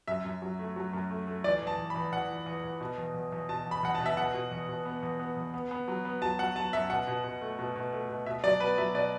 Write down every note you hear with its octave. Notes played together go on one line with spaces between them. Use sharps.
F#2 E5
F#2
F#3
A3
F#3
F#2
A3
A3
E3 D5
E2
A5
E2
B5
E2
E2 F#5
E3
E2
E2
B2
E2
E2
E2
B2 A5
E2
B5
E2 F#5
A5
B2
E5
E2 F#5
B2
E2
B2
B3
E2
B3
E2
B3
B3
F#3
B3
F#3 A5
F#3 F#5
F#3 A5
F#2 E5
B2 F#5
B2
B2
A3
B2
B2
A3
B2
B2 E5
F#3 D5
B3 B4
F#3 E5
B2 D5